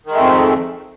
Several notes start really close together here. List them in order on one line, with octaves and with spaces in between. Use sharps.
D#3 G#3 A3 F2